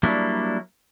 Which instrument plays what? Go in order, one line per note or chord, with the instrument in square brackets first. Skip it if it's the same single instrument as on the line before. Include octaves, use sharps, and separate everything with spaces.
[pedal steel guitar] F#3 G3 A#3 D4 E4